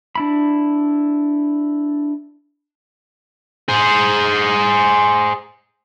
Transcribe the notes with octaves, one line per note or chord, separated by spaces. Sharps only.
D4 E4 B5
G#4 C5